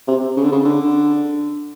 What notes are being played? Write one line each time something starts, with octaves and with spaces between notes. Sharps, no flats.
C3
C#3
D3
C#3
D3